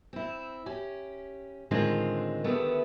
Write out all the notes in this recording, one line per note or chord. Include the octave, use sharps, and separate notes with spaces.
C4 E4
C#4 G4
A2 D3 D#3 G#3 C4 F4
D3 D#3 A3 B3 E4 G4